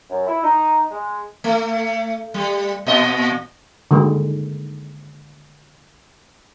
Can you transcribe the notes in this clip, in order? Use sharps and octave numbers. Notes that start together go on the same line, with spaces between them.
F#2
E4
D#4
G#3
A3
G3
A#2 D#5
D3 D#3 G#3